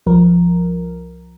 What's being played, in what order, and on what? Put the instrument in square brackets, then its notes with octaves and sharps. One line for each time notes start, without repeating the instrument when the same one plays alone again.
[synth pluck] C2 F3 A#4